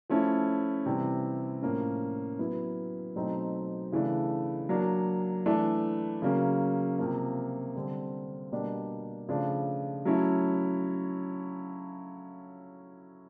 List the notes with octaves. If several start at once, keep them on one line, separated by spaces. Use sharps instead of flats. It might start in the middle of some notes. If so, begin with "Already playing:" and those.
F3 A3 C#4 E4
C3 E3 G3
A2 F3 A#3 C#4
F#3 B3 E4
B2 F#3 A3 C4 D#4
C#3 E3 A3 D4
F#3 A#3 D4
E3 A3 D4
C#3 F#3 A#3 C#4
C3 F3 A#3
D3 G3 C4
B2 G3 A#3 D4
C#3 F3 A3 D4
F#3 A3 C#4 E4